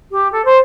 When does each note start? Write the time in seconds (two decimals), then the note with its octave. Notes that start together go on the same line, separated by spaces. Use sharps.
0.11 G4
0.32 A4
0.45 C5